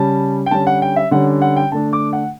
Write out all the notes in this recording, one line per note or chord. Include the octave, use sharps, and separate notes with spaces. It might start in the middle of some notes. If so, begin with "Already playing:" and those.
Already playing: C#3 G3 C#4 A5
G5
D3 G3 C#4 A5
F#5
G5
E5
D3 G3 C#4 F#5
F#5
G5
D3 A3 D4 A5
D6
F#5